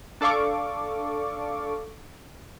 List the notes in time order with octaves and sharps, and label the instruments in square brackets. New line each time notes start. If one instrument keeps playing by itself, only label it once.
[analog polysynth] D4 A4 D5 F5 C#6 D6